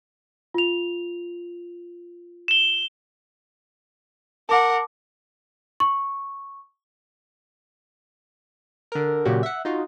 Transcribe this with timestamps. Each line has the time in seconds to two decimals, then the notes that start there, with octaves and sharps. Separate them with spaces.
0.54 F4 F7
2.48 E7 G7
4.49 A#4 F#5 A5 D6
5.80 C#6
8.92 D3 A#4
9.25 F#2 A#2 C#3 F#4 G4
9.43 E5 F#5
9.65 D#4 F4 F#4